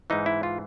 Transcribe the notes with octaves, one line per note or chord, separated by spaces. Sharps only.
G#2 E3 D#4
E4
F4